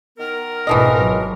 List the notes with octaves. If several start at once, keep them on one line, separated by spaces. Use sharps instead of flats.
D#3 B3 A#4
G#1 B2 E3 F3 D#5
F#3